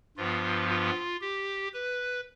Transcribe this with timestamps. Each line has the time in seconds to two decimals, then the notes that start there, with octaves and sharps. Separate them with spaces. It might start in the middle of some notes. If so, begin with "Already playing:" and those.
0.17 G2 F3 B3 F4
0.69 F4
1.21 G4
1.74 B4